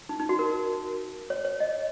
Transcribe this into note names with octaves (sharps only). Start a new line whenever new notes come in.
D#4
D#4
F#4
A#4
C#5
C#5
D#5